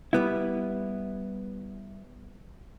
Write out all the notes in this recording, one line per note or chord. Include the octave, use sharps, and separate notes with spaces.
G3 B3 E4